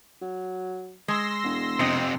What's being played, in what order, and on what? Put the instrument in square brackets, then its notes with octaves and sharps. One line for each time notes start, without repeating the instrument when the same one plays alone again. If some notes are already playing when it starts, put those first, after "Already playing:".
[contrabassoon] F#3
[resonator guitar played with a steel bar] G#3 [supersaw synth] C6 E6 A#6
[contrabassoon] E1
[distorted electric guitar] F2 C3 [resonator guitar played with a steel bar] C4 D#5